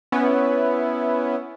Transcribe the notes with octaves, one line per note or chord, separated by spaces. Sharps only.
B3 C#4 E4